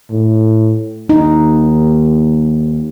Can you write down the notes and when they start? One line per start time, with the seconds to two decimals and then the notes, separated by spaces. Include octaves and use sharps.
0.10 A2
1.09 D#2 D#4